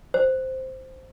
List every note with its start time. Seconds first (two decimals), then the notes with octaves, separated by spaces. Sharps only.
0.14 C5